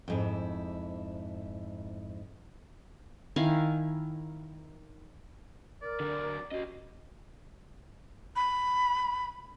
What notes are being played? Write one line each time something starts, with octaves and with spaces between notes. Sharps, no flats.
F2 G#2 E4
D#3 E4 F5 G#5
A#4 D5
D3 F#3 D4
C#4 F#4 G4 D#5
B5